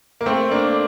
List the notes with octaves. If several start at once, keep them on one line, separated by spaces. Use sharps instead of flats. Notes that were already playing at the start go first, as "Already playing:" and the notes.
A#3
A3 C4
A#3 D4